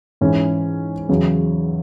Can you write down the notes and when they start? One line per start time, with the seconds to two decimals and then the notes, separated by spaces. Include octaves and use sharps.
0.21 G#2 E3 C#4
1.09 E2 C#3 F#3